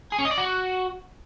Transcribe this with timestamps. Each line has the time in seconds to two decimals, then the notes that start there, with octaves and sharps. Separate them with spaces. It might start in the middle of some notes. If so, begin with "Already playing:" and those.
0.12 G#4
0.19 C#4
0.25 D#5
0.31 D5
0.38 F#4